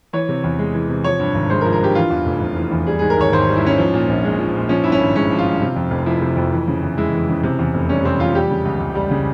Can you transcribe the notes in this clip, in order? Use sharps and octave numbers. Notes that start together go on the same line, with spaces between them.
E3 C#5
C3
E2
G#3
E3
C3
F3 C#5
G2
G#1
G#3 C5
A#4
F3
A#4
G2 G4
E3 F4
E2
F1
F1
E3
E2
G3 G#4
G#2 G#4
A#4
G#1 C#5
G#1 C5
G3
E4
G#2 C#4
F3
A#2
A#1
G#3
F3
A#2
F3 C#4
G2 E4
C#4
G#1
G#3 C#4
F3
F4
G2
C3
F2
F1
F3 E4
C3
F2
E3
C#3
E2
G#3 E4
E3
C#3
C3
E2
F1
G3 C#4
C3 C4
E2 F4
G3 G4
C#3
C#2
C#2
G3
C#3